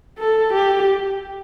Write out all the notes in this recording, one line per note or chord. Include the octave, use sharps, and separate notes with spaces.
A4
G4